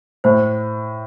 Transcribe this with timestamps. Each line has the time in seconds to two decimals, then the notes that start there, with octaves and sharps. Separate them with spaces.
0.24 A2 C5